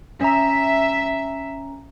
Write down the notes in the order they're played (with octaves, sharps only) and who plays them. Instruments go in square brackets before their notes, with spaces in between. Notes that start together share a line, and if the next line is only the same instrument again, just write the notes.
[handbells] C#4 A#5 [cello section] E5